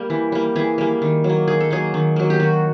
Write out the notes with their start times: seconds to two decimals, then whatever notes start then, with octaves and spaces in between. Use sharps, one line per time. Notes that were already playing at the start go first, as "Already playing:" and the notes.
Already playing: G3 A#3 G4
0.10 E3
0.32 G3 A#3
0.55 E3 G#4
0.78 G3 A#3
1.02 D#3
1.24 F#3
1.29 A#3
1.48 D#3 G#4
1.60 A4
1.71 F#3 A#3 G#4
1.94 D#3
2.16 F#3 A#3
2.30 G4
2.40 D#3 F#4